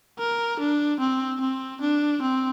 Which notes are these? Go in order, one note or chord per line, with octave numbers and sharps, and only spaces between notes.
A#4
D4
C4
C4
D4
C4